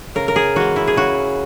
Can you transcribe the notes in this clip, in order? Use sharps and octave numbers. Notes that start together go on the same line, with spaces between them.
C#3 A#4
A#4
G#4
E3 G#3 F#4
E4
G#4
C#3 F#4